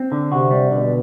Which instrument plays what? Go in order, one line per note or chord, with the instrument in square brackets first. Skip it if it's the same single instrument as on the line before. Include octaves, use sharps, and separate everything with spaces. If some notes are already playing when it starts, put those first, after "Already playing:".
Already playing: [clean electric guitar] C4
D3
[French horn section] C3 [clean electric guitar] F#4
[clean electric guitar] G3
[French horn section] B2 [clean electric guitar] D3